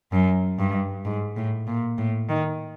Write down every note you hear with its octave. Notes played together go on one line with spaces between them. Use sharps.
F#2
G2
G#2
A2
A#2
A2
D#3